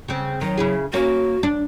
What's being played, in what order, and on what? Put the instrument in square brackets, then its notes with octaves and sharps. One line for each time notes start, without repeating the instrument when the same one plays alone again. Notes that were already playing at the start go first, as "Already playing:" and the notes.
[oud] C#3 C4
[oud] D#3 [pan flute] F#3
[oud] C#3 E4 G#4
[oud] A#3 C#4 [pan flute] F#4
[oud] D4